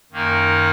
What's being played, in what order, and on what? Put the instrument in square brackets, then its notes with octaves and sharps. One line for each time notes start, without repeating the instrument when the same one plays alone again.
[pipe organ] F#2 D#3 A#3 D#4 A#4